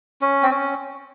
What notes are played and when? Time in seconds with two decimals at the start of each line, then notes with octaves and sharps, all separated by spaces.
0.21 C#4
0.43 C4
0.51 C#4